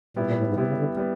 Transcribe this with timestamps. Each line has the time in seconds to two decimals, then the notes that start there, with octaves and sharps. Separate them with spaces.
0.16 A#2 G3 B3 E4
0.26 A#2
0.37 A2
0.47 G#2
0.57 C3 G3 B3 E4
0.67 C#3
0.77 D3
0.97 G3 B3